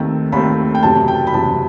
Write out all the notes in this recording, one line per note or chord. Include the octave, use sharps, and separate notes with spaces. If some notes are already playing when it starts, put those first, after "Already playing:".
Already playing: D#2 D#3 A3 C4
D#2 D#3 A3 C4 B5
G5
F#1 E2 C3 F#3 A5
G5
B5
F#1 E2 C3 F#3 A5